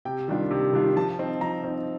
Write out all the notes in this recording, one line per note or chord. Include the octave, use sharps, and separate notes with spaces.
C3 G5
D#3 G3 D4 F4
C3
D#3 G3 D4 F4
F3 A5
C4 D#4
F3 A#5
C4 D#4